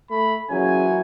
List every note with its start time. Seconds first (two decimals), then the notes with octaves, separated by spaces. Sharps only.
0.11 A3 B5
0.50 A#2 C#3 E3 F#3 G#5